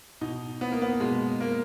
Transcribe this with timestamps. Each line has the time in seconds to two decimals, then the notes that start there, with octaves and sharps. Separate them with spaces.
0.21 B2 D#4
0.61 B3
0.72 A#3
0.82 B3
1.00 B2 G#3
1.41 A#3